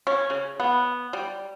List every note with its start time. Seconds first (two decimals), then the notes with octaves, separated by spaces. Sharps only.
0.07 C#4
0.30 C#3
0.60 B3
1.13 G3